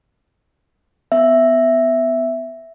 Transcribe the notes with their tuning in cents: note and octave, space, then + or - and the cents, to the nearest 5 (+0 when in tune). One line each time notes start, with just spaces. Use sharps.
B3 +20 E5 +0